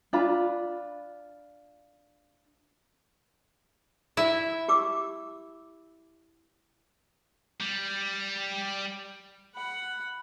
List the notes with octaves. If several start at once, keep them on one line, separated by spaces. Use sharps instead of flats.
D4 F4 B5
E4 E5
G4 D6 E6
G3
F#5 B5